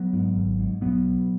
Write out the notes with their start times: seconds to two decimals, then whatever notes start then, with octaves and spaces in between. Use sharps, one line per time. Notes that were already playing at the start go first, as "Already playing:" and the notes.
Already playing: F#3 B3
0.13 G#2
0.36 G#1
0.59 G#2
0.81 B1 F#3 B3
1.05 B2